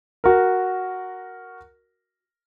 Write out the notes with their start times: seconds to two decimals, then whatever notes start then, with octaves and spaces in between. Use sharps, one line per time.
0.24 F#4 A#4